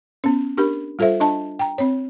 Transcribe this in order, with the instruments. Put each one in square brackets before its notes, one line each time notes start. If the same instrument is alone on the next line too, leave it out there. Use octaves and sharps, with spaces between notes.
[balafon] B3 C#4
D4 G4 A#4 B5
G3 F4 A4 C5 E5
D4 D#5 A5
G5 A#5
C4 C#5